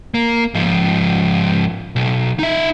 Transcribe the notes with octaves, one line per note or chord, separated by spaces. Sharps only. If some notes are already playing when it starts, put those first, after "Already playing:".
A#3
G#2 F3
B1
D#4 E5